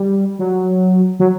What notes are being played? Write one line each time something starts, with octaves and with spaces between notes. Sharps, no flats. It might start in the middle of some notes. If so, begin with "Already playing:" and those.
Already playing: G3
F#3
F#3